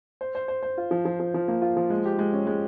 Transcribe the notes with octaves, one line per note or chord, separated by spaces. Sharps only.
C5
C5
C5
C5
F4
F3
F3
F3
F3
A#3
F4
F3
G#3
G4
G#3
C#4
G#3